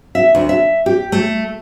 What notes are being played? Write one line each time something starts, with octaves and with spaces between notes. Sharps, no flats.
E5
D2
E5
G4
A3